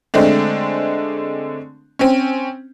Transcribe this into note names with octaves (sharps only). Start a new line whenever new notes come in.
D3 G#3 A3 C4 D4
C4 C#4